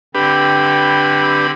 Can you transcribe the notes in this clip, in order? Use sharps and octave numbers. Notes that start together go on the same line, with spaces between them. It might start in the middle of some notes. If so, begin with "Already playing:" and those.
D3 C4 D4 G4 B4 B5